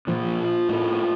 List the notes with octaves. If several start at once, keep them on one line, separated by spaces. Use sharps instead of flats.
A#2 F3
A2